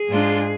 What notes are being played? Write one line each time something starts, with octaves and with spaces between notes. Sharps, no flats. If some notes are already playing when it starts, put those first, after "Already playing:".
Already playing: G#4
G#2 G#3 D4 F4